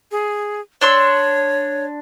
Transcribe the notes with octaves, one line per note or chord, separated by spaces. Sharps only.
G#4
D4 C#5 C6 E6